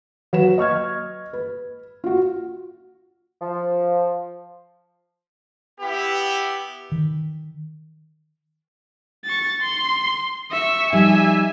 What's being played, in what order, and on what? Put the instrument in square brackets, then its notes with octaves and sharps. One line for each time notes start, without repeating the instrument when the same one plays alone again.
[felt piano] F#3 B4 E7
D#5 C#6 F6 G#6
B4
F4 F#4
[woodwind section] F3
[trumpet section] B3 E4 G4
[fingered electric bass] D#3
[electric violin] C#6 A6
C6
E5 C#6
[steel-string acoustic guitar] F3 G3 D#4 [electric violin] E5 G#5